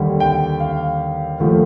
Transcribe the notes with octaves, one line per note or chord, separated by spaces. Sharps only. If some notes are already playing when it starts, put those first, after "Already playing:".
Already playing: D#2 D3 G3
G5
F5
D#2 D3 F3 A3